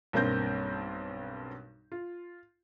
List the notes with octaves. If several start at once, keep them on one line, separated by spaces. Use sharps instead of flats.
B1 G2 A#3 C4 G6 A#6
F4